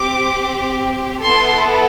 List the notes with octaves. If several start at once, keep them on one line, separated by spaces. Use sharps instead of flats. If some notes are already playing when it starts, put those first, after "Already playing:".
Already playing: C4 G4 D6
B3 E4 A4 C6